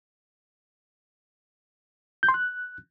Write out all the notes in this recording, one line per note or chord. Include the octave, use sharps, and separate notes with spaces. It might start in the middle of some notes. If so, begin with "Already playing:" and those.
G6
C6
F#6